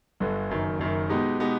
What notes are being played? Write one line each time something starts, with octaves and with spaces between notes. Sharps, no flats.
G1 G2 D3
F#1 F#2 D#3
F#1 F#2 D#3
B2 G#3 B3 D#4 G4
B2 G#3 B3 D#4 G4